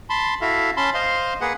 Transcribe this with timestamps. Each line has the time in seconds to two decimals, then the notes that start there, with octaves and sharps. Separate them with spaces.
0.10 A5 B5 C6
0.41 E4 F#4 A4 E5 F5
0.77 C#4 A5 B5 C6
0.94 C5 D#5 F5 C6
1.41 A#3 G#4 B4 F#5